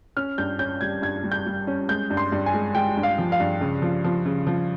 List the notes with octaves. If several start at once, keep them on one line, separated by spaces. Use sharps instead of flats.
C#4 F6
G2 G6
C#4 G6
G3 G#6
G2 G#6
G3
G6
G3
C#4
G#3 G6
G2
C6
G2
G#5
G#3
G#3 G5
G2
F5
F3
F5
G2
C#3
F3
F3
C#3
F3